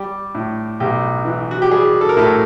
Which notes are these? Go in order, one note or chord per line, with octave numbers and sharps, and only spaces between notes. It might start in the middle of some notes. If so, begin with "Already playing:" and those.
Already playing: G3 G4
A2
B1 G4
E3
F#4
G4
G3 G#4
A4
A#4
A2 A4